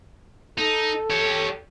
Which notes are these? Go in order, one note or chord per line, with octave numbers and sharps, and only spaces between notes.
D#4 A4
G4 C#5